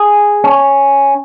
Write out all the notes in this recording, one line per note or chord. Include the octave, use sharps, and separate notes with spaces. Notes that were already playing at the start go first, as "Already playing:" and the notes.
Already playing: G#4
C#4